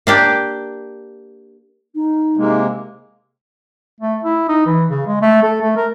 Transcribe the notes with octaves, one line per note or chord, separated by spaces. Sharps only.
A#3 D4 G4
D#4
C3 G#3 A#3
A3
E4
D#4
E3
C#3
G#3
A3
A4
A3
A#4